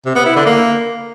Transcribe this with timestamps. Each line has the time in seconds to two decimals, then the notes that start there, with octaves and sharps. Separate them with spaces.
0.06 C3
0.16 B3
0.26 E4
0.36 D3
0.46 A#3